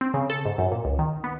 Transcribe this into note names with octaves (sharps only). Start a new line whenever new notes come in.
C4
C#3
A4
G#2
F#2
A#2
C#2
D#3
B3